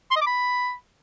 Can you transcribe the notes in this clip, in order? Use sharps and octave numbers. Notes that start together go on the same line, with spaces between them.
C6
D#5
D6
B5